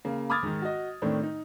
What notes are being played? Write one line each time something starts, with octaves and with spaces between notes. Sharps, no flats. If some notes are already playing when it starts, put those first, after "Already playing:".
C#3 A#3
B5 D6 D#6 F6 G#6 A6
G#2 D#3
F#4 D#5
A2 D#3 A3 C4 D4
D#4